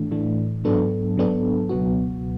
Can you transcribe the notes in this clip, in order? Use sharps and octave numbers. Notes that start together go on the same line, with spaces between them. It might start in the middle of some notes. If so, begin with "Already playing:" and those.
Already playing: A2 E3 A3 D4
A2 E3 A3 D4
G#2 F#3 B3 D4 A4
G#2 F#3 B3 D4 A4
C#2 B2 F#3 B3 F#4